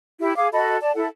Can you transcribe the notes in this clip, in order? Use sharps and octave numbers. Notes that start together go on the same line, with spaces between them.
E4 G4
G#4 F5 D6
F#4 A4 D#5 B5
D5 A5
E4 A4 F#5